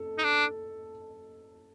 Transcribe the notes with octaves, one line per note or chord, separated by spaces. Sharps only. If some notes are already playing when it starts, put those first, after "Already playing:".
Already playing: A4
D#4
D4